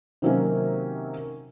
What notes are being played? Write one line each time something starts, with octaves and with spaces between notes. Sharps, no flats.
C3 D#3 F#3 A#3 C4 C#4